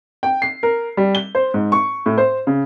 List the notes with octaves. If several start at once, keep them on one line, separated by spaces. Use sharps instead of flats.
G5
C7
A#4
G3
G7
C5
G#2
C#6
A2
C5
C#3